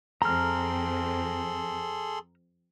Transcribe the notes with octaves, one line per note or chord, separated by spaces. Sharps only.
F2 C4 G#4 A4 A#5 C6 F6